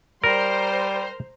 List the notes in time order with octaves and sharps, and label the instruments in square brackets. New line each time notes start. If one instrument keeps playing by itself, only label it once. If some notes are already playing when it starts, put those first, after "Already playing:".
[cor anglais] G3 [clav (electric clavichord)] A#4 [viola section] C5 A#5 C6